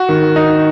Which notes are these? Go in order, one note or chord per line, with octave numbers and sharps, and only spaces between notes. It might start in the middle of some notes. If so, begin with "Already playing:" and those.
Already playing: F#4
D#3
D#4